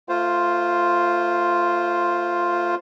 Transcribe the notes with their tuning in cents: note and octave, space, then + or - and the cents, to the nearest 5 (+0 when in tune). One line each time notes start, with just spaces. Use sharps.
A3 +25 F4 +0 C5 +0